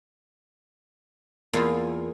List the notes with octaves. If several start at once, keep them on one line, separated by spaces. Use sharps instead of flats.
E2 A#3 F4